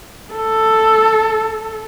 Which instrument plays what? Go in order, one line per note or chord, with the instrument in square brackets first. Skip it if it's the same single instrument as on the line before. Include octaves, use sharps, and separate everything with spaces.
[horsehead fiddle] A4